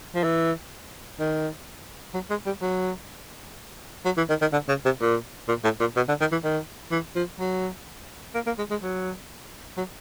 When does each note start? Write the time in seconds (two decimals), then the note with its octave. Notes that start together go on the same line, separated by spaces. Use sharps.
0.15 F3
0.23 E3
1.19 D#3
2.14 F#3
2.30 G#3
2.46 G3
2.62 F#3
4.05 F#3
4.17 E3
4.29 D#3
4.41 D#3
4.53 D3
4.69 C#3
4.85 C3
5.01 A#2
5.48 A#2
5.64 A2
5.80 A#2
5.96 B2
6.08 D3
6.20 D#3
6.32 E3
6.44 D#3
6.92 E3
7.16 F3
7.40 F#3
8.35 A#3
8.47 A#3
8.58 G#3
8.71 G#3
8.83 F#3
9.78 F#3